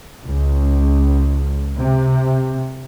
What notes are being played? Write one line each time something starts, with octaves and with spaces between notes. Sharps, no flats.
C#2
C3